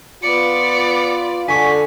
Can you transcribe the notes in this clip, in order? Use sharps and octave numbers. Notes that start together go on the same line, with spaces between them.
B3 F4 D5 C#7
D3 G#5 C#6 B6